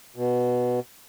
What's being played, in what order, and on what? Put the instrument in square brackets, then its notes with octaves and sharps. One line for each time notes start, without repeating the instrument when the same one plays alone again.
[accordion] B2